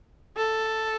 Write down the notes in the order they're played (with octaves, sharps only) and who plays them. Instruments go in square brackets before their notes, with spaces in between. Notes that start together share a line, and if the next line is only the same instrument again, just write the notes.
[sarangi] A4